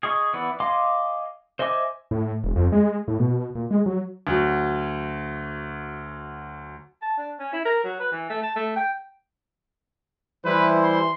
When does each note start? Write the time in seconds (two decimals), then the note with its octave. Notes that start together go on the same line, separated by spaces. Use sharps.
0.03 G#4 D#5 C#6 D#6
0.33 E3 B3 B4 D5
0.60 D#5 F5 G#5 C6 D6
1.59 C5 D#5 E5 G#5 D6
2.11 A2
2.44 E1
2.56 F2
2.72 G#3
3.08 A2
3.20 B2
3.55 A#2
3.71 G#3
3.86 F#3
4.27 D2 F#3
7.02 A5
7.18 D4
7.39 C#4
7.53 E4
7.65 A#4
7.84 F#3
8.00 B4
8.12 E3
8.30 A3
8.43 A5
8.56 A3
8.76 G5
10.45 E3 G3 E4 B4 C5
10.82 C6